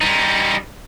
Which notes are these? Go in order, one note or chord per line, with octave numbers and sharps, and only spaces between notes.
G3 D#4